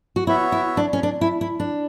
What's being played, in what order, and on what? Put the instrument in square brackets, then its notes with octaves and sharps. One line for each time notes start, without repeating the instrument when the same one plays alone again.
[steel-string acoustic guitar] F#4
[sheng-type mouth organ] B3 F#4 C#5 E5 [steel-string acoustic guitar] E4
[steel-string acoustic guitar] E4
D4
C#4
D4
E4
E4
D4